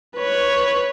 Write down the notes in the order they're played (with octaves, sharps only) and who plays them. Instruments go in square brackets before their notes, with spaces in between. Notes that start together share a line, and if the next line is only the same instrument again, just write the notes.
[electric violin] B4 C#5